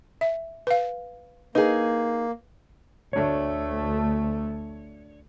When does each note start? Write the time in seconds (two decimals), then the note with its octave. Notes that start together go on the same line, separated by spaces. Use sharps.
0.21 E5
0.67 B4 F5
1.55 A#3 D#4 G#4 B4
3.13 D2 A3 D4 C#5